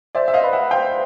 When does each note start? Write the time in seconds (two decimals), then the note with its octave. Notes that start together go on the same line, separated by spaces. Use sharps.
0.15 C5 D5 E5
0.28 E5
0.34 D#5 F5
0.44 B4
0.53 E5 F#5
0.71 C5 F5 G5